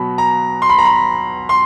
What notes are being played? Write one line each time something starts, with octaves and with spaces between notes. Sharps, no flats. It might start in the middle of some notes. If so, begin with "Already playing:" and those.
Already playing: B2 F#3 B5
A#5
C6
B5
A#5
B5
C6